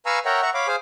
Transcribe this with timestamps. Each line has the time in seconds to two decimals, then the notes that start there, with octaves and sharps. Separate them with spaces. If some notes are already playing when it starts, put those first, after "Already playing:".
0.06 B4 F5 G#5 A#5 C#6 E6
0.25 A#4 C#5 E5 F#5 G5 A#5
0.42 E5 F#5 A#5 C#6
0.54 C#5 F5 B5 D6
0.68 G#4 C5 F5 G#5